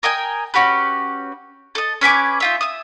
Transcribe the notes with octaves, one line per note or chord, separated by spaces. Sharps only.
A#4 D#5 G5 G#5
C#4 F#4 G4 B4
A4 D#5
C#4 B4 G#5 D6
D#4 F4 E5
E5 D#6